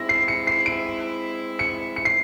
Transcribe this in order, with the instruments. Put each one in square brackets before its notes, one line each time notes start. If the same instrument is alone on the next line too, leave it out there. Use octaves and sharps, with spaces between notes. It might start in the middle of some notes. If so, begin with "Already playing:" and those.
Already playing: [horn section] G#3 C4 E4 [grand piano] A#6
[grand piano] C7
C#7
C7
D7
C#7
C#7
C7